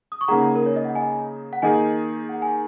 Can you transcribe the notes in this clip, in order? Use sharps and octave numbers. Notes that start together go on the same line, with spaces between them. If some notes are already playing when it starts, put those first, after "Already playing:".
D#6
C#6
C#3 A#3 D#4 G#4 F#5 A#5
A#4
C#5
D#5
F#5
D#5 G#5
F#5
D#3 A#3 D#4 G#4 D#5 G#5
F#5
G#5